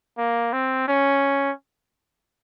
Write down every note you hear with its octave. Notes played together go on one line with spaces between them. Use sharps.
A#3
C4
C#4